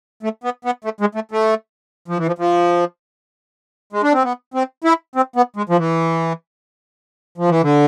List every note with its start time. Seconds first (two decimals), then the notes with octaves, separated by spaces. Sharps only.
0.23 A3
0.44 B3
0.65 B3
0.84 A3
1.01 G#3
1.15 A3
1.31 A3
2.08 F3
2.17 E3
2.27 F3
2.38 F3
3.93 G#3
4.03 D4
4.13 C4
4.24 B3
4.54 C4
4.84 E4
5.15 C4
5.36 B3
5.56 G#3
5.69 F3
5.77 E3
7.38 F3
7.49 E3
7.62 D3